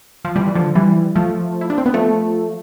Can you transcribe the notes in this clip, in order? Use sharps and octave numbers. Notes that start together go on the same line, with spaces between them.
F3
E3 G3
E3
D3 F3
E3 G3
F3 A3
E4
D4
C4
B3
F3 A3